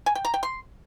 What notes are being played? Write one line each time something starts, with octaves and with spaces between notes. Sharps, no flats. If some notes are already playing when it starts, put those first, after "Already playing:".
G#5
G5
A#5
G5
C6